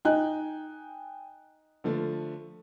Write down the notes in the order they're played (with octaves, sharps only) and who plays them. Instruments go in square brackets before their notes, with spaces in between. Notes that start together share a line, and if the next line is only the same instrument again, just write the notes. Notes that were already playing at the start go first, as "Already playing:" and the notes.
[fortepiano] D#4 [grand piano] G5 G#5 F#6
[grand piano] D3 F3 A3